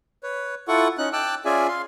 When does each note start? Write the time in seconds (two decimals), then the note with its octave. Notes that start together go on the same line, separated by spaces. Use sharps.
0.23 B4 C#5
0.68 E4 F4 A4 F#5 C#6
0.98 C#4 D#4 F#6
1.13 G5 A5 D6 E6 F#6
1.45 C#4 F4 G#4 D5 E5 G#5
1.68 F5 C6